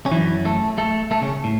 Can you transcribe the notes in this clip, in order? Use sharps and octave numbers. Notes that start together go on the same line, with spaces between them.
C#4
F#2 E3 F#3 E4
A3 A4
A3 A4
A3 A4
C#3 C#4
A2